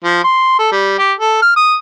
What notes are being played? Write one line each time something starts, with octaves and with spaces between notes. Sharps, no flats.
F3
C6
A4
G3
G4
A4
F6
D#6